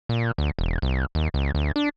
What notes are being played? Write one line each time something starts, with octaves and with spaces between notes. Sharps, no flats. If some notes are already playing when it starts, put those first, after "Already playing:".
A#2
D2
E1
C2
D#2
C#2
D2
D4